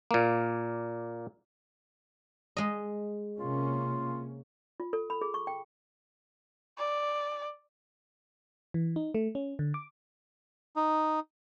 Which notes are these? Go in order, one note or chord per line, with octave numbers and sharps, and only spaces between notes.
A#2 A#3
G#3 D#5
C3 A#3 C#4 F4
F4
A4
B5
G#4
C#6
G5
D5
E3
D#4
A3
C#4
D3
D6
D#4